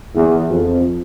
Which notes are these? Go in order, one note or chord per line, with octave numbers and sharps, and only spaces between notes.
E2
F2